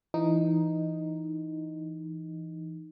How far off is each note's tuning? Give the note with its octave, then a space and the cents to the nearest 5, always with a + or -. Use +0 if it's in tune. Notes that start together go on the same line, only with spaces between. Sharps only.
E3 +15 D#4 +0